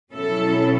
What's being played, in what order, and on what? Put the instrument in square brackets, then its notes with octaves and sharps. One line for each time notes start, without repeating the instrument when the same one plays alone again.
[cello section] B2 F#3 C#4 E4 A4